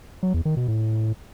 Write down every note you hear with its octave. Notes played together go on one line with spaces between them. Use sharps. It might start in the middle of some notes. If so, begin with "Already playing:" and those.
F#3
E2
D#3
B2
A2